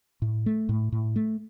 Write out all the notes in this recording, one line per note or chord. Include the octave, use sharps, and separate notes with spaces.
A2
A3
A2
A2
A3